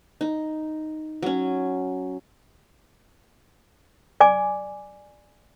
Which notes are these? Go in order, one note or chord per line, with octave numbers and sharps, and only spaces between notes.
D#4
F#3 C#4
D5 G#5 D6